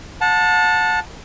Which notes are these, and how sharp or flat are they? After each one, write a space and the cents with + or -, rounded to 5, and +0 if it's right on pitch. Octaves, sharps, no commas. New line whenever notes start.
F#5 -35 A5 +0